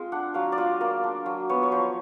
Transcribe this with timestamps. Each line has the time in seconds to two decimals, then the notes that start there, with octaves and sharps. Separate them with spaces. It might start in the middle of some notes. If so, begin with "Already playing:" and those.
Already playing: G#3 C4 F4
0.12 D4 F#5
0.34 F#3 F5
0.52 D5
0.58 F4 D#5
0.81 A#3 D5
1.04 D4
1.26 F#3
1.49 B3 C#5
1.63 C#5
1.72 F3 C5